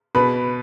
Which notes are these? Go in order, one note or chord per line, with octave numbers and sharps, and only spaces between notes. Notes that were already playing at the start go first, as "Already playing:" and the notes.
B2 B4 B5